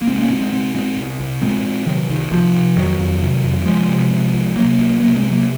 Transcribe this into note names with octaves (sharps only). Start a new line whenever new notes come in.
A#3
C2 G#3 C4
A#3 C#4
A#2 G#3 C4
G#3 C4
C2 G#3 C4
A#2 G#3 C4
C2
C2
A#2 G#3 C4
A#2
C3 D#3 F#3
C2 D#3
C2 F3
C3
F2 D#3 F#3
F2
C3
F2
C2 F3 G#3
C3
C3
C2
C3 F#3 A#3
C2
C3 F#3 A#3
G#3 C4
C3
F#3 A#3